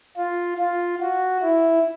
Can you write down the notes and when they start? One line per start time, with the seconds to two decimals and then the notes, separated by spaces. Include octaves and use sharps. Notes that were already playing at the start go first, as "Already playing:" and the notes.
0.17 F4
0.58 F4
1.00 F#4
1.42 E4